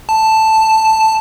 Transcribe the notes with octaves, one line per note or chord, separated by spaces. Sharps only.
A5